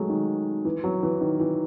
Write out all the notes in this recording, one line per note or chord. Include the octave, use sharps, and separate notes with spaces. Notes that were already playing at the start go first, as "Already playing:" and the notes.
Already playing: F#3 G#3 A3
D#3
E3
F#3
E3
D#3
E3